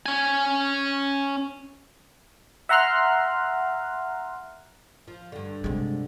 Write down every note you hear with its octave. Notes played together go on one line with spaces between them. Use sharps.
C#4 G#5
E5 F#5 A#5 C6 F6 F#6
F3
G2 D3
C3 G#3